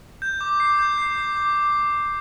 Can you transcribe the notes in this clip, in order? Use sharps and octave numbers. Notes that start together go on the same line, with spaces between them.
G6
D6
C7
G6
C7
D6
D6
D6